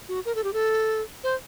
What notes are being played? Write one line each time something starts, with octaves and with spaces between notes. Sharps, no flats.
F#4
A#4
A4
G4
A4
C5